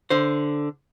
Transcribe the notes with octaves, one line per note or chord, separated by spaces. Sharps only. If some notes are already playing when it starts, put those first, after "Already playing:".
D3 C5